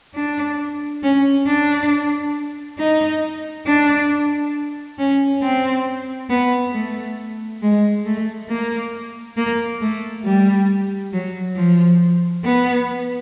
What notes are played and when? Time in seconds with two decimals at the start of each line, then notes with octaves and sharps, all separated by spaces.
0.15 D4
1.03 C#4
1.47 D4
2.79 D#4
3.67 D4
4.99 C#4
5.42 C4
6.30 B3
6.74 A3
7.62 G#3
8.05 A3
8.49 A#3
9.37 A#3
9.81 A3
10.25 G3
11.13 F#3
11.56 F3
12.45 B3